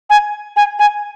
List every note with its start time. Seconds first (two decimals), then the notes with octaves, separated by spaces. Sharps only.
0.10 G#5
0.56 G#5
0.79 G#5